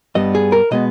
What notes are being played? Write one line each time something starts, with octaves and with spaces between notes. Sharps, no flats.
G2 G3 B3 D#5
G#4
A#4
B2 G#3 B3 D#5